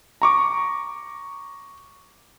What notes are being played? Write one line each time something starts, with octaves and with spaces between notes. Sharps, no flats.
A#5 C#6 D6